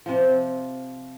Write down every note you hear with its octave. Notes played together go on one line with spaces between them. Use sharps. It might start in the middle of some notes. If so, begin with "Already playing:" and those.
C3 F3